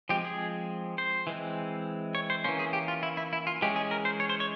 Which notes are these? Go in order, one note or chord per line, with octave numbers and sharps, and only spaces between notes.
F3 G#3 C4 G4
G#4
C5
E3 G#3 C4
C#5
C5
E3 A#3 C#4 C5
G#4
G4
F4
E4
E4
E4
F4
E3 G#3 C#4 G4
G#4
A#4
C5
C#5
C5
C#5